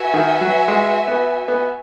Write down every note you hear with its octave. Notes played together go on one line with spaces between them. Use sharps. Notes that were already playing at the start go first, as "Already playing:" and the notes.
Already playing: F#4 B4 E5 G#5
D#3
F#3
G#3
B3
B3